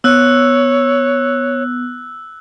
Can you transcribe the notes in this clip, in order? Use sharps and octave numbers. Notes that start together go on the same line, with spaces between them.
B3 C#5 E6 F#6